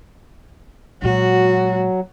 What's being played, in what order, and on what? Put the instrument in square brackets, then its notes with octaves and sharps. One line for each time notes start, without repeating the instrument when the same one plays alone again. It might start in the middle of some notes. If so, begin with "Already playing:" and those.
[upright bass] A#2 G#3 [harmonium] F#3 [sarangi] F#4